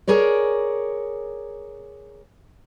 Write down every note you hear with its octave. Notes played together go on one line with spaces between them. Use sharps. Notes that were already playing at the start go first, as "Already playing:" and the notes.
G#4 A#4 C#5 D5